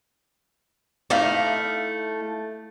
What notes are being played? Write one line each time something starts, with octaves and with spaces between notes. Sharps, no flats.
A3 D#4 E4 F5